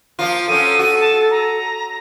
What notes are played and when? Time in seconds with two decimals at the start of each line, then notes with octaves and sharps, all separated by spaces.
0.19 F3 A#3 F4
0.48 F3 F#3 C#4 A4 D#7
0.79 F#4
1.00 A5
1.30 A#5